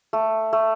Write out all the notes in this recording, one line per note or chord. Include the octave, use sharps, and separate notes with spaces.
A3
A3